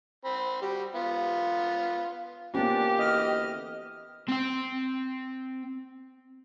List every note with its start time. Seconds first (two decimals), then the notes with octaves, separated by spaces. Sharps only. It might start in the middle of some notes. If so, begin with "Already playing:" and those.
0.25 C4 B5
0.62 G3 F#4 G4
0.95 B3 F4
2.55 F3 A#3 B3 C#4 D4 G4
3.00 D2 E3 D#5 F6
4.29 C4 G5